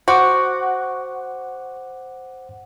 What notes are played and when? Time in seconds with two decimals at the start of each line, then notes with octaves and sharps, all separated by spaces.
0.08 F#4 C5 F#5 D6